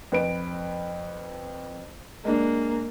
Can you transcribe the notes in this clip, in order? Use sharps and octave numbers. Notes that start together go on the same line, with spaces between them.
F2 B4 D7
G#3 A#3 D4